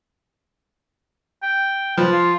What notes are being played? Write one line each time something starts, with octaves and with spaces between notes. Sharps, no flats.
G5
F3 B4
F4